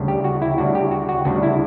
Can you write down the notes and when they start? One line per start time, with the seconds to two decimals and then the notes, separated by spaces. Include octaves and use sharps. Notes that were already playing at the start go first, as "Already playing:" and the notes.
Already playing: D2 C#3 G3 D4
0.08 G4
0.24 F#4
0.42 E4
0.58 D2 C#3 G3 D4 F#4
0.75 G4
0.91 F#4
1.09 F#4
1.25 D2 C#3 G3 D4 F#4
1.43 E4